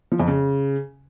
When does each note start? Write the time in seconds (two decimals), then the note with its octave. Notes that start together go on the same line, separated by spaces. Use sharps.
0.12 F3
0.20 F2
0.28 C#3